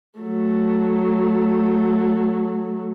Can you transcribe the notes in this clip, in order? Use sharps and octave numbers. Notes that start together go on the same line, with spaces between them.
F#3 A3